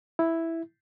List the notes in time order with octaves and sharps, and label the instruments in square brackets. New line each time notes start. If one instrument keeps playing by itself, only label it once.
[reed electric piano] E4